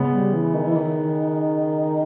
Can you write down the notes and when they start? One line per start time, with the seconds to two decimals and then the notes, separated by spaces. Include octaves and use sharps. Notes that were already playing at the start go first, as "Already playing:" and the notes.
Already playing: C#3 G#3 B3
0.12 G3
0.33 E3
0.54 D#3
0.65 E3
0.76 D#3